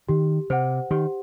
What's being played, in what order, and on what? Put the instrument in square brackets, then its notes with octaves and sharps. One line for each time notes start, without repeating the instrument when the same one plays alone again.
[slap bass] D#3 [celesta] G4
[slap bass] C3 [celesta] C5 F#5
[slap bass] D#3 [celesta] G4